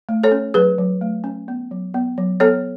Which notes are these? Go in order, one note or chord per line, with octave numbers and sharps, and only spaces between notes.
A3
A4 C#5
C#4
F#3 G#4 B4
F#3
A3
C#4
B3
F#3
B3
F#3
B3 A4 C#5